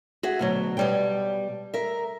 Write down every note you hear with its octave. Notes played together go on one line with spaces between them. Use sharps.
F#4 G#4 E5
D2 B2 F#3
B2 G3 G5
A#4 E5